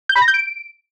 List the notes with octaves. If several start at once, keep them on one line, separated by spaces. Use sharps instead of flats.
G6
B5
A#6
G6
D7